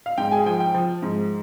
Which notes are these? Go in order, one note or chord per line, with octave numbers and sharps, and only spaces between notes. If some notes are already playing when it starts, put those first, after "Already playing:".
F5
G#2 G5
G#4 G#5
F3 G5
G5
F3
G#2